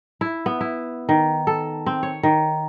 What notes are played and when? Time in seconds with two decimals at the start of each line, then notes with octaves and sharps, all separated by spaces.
0.21 E4
0.46 B3
0.61 E4
1.09 D#3
1.47 A4
1.86 C4
2.03 C#5
2.23 D#3